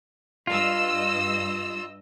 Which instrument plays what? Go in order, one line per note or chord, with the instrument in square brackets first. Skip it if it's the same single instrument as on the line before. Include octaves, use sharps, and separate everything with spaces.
[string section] G2 D#5 E6 [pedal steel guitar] F4